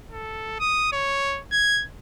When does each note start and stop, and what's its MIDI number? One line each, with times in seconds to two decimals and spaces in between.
0.12 0.56 69
0.60 0.87 87
0.92 1.40 73
1.52 1.84 92